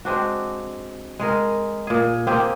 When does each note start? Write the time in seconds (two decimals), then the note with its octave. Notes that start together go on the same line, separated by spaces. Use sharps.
0.05 G#3 C4 D4 F#4
1.20 G#3 G#4 A#4
1.87 A#2 G#4
2.27 A#3 C4 G4 G#4